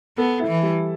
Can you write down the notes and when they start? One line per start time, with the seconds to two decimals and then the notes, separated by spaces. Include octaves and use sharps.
0.18 B3 A4
0.40 E4
0.48 E3
0.63 G3